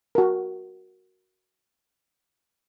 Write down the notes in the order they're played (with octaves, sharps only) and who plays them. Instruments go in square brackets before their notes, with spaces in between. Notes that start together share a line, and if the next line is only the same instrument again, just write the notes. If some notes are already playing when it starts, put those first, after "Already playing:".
[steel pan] F#4 A#4